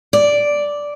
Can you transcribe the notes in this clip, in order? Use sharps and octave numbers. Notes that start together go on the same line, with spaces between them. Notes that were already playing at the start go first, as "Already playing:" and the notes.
D5